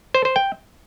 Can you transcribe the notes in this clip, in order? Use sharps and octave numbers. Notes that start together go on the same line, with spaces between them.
C5
C5
G5